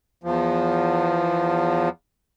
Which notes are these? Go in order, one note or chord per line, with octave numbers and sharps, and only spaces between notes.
E2 F3